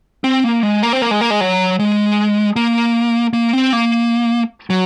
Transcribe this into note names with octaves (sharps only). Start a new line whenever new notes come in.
C4
A#3
G#3
A#3
C4
A#3
G#3
A#3
G#3
F#3
G#3
A#3
A#3
C4
A#3
F#3